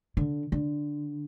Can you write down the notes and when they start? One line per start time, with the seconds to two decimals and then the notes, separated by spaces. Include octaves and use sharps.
0.17 D3
0.52 D3